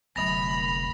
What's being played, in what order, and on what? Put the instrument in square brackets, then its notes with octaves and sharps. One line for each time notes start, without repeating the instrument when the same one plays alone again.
[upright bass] F1 D2 [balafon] F#3 B3 [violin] B5 [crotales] A#6 F7